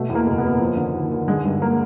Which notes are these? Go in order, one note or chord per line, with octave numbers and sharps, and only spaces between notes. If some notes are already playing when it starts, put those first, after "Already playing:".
Already playing: B2 A3
E2
A#3
F#1
B3
F#1
F3
D3
D#2
D#2
D3 G#3
G2 G#3
A#3